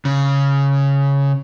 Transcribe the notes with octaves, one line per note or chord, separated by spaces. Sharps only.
C#3